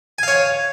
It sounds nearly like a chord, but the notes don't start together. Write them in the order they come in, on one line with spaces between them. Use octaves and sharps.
G#5 F5 C#5